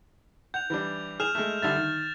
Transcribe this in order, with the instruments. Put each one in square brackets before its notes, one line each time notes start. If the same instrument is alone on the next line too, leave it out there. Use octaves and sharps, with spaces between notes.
[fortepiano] F#5 [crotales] G6 F7
[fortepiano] E3 G3 D4
[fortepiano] G#4 [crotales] F6 E7 F7
[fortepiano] G#3 A3 [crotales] E7
[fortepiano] D3 G3 E5 [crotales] A6
[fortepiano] D#3